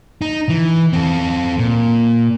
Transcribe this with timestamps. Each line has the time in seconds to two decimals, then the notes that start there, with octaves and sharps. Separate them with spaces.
0.22 D#4
0.49 E3
0.93 C4 A4
1.59 A#2